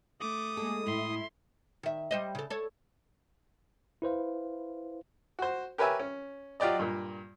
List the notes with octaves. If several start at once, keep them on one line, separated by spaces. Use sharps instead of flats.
A3 D6 D#6
G#3 A#3 G#4 A4
A2 E4 E5 C6
D#3 E5
G3 C5 D#5
C#3 A4
A4 C#5
E4 B4 C5 F5
F#4 C5
G4 A#4 B4 C#5 E5 G#5
C#4
F#3 F4 G4 D5 D#5
G2 A#2